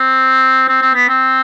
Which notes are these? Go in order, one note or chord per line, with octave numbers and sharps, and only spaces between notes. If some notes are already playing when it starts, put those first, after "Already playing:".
Already playing: C4
C4
C4
B3
C4